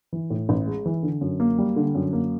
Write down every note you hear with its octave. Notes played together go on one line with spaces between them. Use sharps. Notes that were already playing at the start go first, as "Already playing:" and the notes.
E3
A2
A1
G#3
E3
D3
F#2
A#3
G3
D3
F#2
A#3